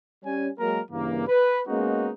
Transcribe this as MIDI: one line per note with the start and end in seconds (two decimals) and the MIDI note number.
0.25 0.48 55
0.25 0.48 61
0.25 0.48 80
0.60 0.81 54
0.60 0.81 56
0.60 0.81 58
0.60 0.81 70
0.91 1.24 43
0.91 1.24 49
0.91 1.24 52
0.91 1.24 58
1.28 1.61 71
1.67 2.12 56
1.67 2.12 58
1.67 2.12 59
1.67 2.12 61
1.67 2.12 63
1.67 2.12 66